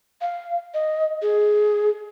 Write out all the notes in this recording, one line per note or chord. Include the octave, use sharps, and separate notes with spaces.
F5
D#5
G#4